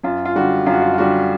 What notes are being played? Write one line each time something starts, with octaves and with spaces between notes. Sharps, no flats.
F#2 F4
F4
D3 G3 F#4
F#2 F4
F#4
F4
F4
D3 G3 F#4